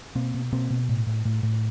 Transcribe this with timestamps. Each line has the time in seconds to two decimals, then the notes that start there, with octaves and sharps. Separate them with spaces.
0.15 B2 A#3 C4
0.34 B2
0.52 B2 A#3 C4
0.71 B2
0.89 A2
1.07 A2
1.25 A2
1.43 A2